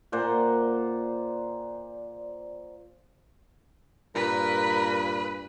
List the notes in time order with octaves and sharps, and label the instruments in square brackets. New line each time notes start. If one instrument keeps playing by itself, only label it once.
[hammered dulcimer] A#2 C5 D5 F#5
[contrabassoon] G2 [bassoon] A#2 [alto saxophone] A#4 [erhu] B4